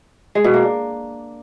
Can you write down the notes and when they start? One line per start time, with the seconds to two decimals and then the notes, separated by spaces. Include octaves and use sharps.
0.35 G#3
0.44 B2
0.54 A#3
0.63 D4